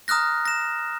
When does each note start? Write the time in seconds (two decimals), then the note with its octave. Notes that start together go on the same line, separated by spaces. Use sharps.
0.08 A#5 D#6 F6 F#6 A#6
0.45 A#6 E7